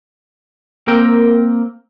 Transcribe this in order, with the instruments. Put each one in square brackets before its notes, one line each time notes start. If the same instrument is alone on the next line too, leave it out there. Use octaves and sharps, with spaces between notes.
[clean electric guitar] A#3 C4 A#4 G5